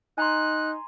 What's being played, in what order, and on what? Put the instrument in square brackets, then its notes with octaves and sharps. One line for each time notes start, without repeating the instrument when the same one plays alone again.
[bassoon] D#4 [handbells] G#5 A#5 C6 [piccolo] F#6